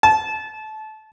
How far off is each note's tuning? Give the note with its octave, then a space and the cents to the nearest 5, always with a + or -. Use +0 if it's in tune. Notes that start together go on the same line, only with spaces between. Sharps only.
A5 -25